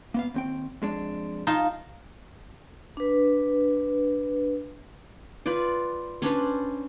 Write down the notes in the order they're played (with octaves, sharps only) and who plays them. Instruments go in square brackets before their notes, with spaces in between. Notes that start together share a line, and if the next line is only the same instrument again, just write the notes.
[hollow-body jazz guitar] A#3 B3 F5
D#2 C4 G5
F2 G#3 D4
[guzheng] D#4 F4 A5
[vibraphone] D4 B4
[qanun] F4 B4 D5
C#4 D4 B4 C5